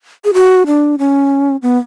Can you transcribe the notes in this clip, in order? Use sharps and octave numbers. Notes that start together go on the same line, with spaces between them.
G#4
F#4
D4
C#4
B3